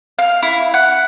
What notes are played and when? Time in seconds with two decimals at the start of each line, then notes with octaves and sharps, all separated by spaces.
0.19 F5
0.42 E4
0.74 F#5